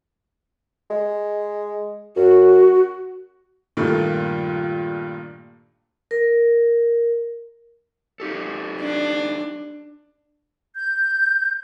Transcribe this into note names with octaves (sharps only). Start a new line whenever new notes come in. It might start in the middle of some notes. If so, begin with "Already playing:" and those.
G#3
F#2 F#4
G2 A#2 D#3 A3
A#4
D#4 G4 A4
D4
G6